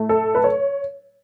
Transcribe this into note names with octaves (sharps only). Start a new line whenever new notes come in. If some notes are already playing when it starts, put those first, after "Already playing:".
Already playing: A2 A3
A4
B4
C#5